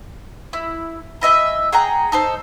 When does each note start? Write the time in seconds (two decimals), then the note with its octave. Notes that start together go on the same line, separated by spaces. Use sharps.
0.53 E4
1.21 E4 D#5 E5 G#5
1.73 G#4 F#5 G5 A#5
2.12 D#4 A4 C5